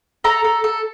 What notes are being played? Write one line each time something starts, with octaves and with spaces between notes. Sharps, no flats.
A4 A#5
A4
A4